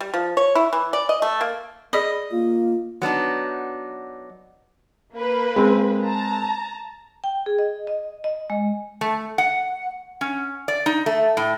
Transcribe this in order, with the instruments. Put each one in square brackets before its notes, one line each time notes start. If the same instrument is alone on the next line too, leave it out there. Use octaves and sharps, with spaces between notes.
[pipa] G3
F3
C#5
E4
E3
D5
D#5
A3
A#3
[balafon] G#4 D5 B5 [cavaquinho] D#5
[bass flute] A#3 [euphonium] F4
[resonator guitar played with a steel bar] F#3 B3 D4 D#4
[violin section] A#3 B4
[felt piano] G#3 C4
[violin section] A5 A#5
[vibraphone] G5
G#4
D#5
D#5
D#5
G#3
[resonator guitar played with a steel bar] A3
F#5
C#4
D5
D#4
A3
A2